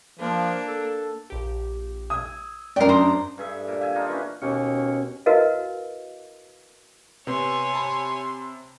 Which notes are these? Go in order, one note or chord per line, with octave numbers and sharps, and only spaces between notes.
F3 A#3 D4
A4
A#1 G4
D#6 E6 G#6
F#2 A3 G4 A#4 D5 A#5 C7
D4 C5 A#5 D#6
G2 G#4 A4 E5
A#2
E5 G#5
D4 D#4 F4
E3 C#4
D#2 B2 C#4
E4 F#4 A#4 B4 D#5 F5
C3 B3 C#5 G#5 C6
A5 B5